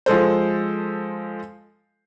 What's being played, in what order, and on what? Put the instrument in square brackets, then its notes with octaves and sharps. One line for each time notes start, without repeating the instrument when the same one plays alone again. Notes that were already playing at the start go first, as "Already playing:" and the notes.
[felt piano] F3 G#3 A4 C5